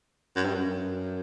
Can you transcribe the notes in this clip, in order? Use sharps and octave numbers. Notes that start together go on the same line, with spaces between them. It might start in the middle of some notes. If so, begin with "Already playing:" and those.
F#2
G2
F#2